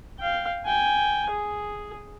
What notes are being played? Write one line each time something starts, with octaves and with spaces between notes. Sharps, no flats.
F5 G5
G5 G#5
G#4